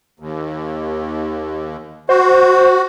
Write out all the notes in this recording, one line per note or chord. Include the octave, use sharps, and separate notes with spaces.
D#2
F#4 C5